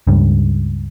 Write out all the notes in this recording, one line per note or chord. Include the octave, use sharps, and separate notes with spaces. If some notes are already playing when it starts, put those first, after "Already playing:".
C#2 G2